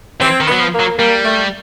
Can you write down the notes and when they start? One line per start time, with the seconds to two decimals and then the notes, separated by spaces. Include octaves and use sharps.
0.21 E3 C4
0.40 D#3
0.48 F#3 B3
0.60 F3
0.74 A#3
0.80 F#3
0.99 G3 A#3
1.25 A3